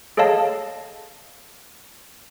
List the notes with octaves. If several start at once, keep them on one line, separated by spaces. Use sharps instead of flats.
G#4 A4 C#5 D#5 F5 A5